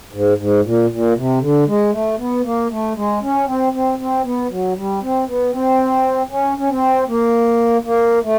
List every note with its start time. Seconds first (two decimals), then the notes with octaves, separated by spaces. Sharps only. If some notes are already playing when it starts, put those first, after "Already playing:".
0.13 G#2
0.38 G#2
0.64 A#2
0.90 A#2
1.16 C3
1.41 D3
1.68 G#3
1.92 A3
2.18 B3
2.44 A#3
2.70 A3
2.96 G#3
3.22 C#4
3.47 C4
3.73 C4
3.99 C4
4.24 B3
4.50 F#3
4.76 G3
5.01 C4
5.28 B3
5.53 C4
6.30 C#4
6.58 C#4
6.69 C4
7.08 A#3
7.84 A#3
8.23 A3